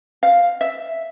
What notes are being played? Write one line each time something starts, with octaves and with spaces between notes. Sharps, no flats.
F5
E5